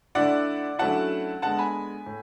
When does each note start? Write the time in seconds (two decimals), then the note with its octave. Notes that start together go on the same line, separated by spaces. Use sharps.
0.15 D3 A3 E4 D5 F#5
0.79 D3 F#3 A3 C#4 E4 F#5 A5
1.42 D3 G#3 B3 F#5 A5
1.59 G#5 B5
2.06 A2